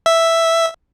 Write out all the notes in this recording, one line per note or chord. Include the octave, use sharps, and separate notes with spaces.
E5